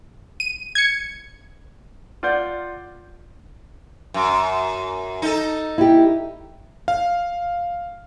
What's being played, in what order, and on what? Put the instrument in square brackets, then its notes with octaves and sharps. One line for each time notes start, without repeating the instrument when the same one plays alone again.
[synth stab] D#7
G#6 C#7
[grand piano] F4 D5 F#5 G6
[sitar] F#2
D#4 A4
[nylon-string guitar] E4 G4
[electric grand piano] F5